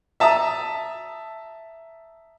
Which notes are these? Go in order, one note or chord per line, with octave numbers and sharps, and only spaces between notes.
E5 A5 A#5 D#6